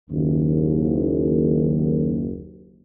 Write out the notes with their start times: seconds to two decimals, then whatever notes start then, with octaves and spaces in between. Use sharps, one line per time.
0.10 F#1 D#2